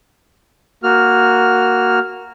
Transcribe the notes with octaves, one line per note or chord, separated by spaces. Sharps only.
A#3 F#4 F6